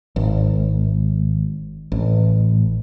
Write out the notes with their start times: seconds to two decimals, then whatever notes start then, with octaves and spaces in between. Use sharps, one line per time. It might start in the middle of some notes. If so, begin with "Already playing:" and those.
0.16 G#1
1.92 A1